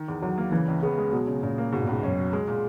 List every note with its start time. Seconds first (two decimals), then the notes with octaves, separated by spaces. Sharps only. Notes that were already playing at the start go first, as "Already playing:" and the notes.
Already playing: D#3
0.08 E2
0.22 E2 F#3
0.38 A#3
0.52 C#3 E3
0.68 C#2
0.82 C#3 B3
0.98 G#3
1.12 B2 F#3
1.27 C#3
1.43 A#2 C#3
1.58 A#3
1.72 G#2 B2
1.82 A#2
1.87 C#2 G#2
2.03 F#2 C#4
2.18 F#3
2.33 G#3
2.48 A#2